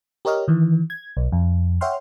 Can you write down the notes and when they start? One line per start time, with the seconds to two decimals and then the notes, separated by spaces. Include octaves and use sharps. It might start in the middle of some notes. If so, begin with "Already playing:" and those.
0.25 G4 A#4 C#5 D#5 F6
0.48 D#3 E3
0.90 G#6
1.17 B1
1.32 F2
1.81 C#5 E5 F#5 G5 C6 F6